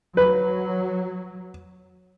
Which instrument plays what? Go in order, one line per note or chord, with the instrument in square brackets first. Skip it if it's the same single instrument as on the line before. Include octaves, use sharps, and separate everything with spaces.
[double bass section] F#3 [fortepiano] B4